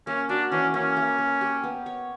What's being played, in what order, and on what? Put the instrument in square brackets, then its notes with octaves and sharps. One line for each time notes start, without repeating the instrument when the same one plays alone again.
[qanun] A#3 [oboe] C#4
[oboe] D4 [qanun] F#4
[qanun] E3 [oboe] C#4
[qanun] A#3 [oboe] C#4
[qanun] A#3
A#3
G4
B3
C#5